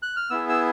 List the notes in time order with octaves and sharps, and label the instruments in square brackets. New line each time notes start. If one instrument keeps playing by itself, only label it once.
[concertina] F#6
F6
B3 E4 G#4 E6
E6